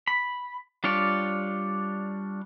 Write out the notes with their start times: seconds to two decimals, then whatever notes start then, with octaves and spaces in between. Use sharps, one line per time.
0.07 B5
0.84 G3 D4 F4 C#5 D5